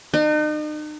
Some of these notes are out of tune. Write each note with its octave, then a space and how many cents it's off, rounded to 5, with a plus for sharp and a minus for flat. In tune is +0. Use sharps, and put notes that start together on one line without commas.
D#4 -40